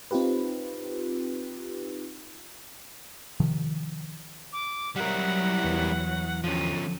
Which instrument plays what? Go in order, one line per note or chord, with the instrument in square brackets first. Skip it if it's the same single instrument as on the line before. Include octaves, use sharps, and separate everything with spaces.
[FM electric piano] C4 D#4 F4 G4 B4
[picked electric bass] C3 D#3 F3
[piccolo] D6
[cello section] F#3 E4 [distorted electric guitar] G3 A#4 [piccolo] F#5
[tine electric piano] E2 E3
[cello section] D3 [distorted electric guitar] F3 C#4 [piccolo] D#7